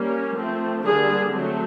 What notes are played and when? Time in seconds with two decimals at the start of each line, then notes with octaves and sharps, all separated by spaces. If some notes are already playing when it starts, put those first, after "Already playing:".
Already playing: G3 A#3 C#4
0.37 F3 A3 C4
0.84 D3 G3 A#3 D4 G#4
1.32 F#3 A3 C4